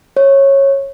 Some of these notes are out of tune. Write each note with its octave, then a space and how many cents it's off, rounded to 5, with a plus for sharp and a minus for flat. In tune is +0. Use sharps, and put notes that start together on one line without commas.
C#5 -15